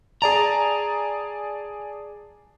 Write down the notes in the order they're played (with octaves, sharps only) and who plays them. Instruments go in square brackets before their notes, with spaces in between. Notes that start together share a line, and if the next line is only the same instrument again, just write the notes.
[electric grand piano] G#4 D5 A5 [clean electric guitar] A#5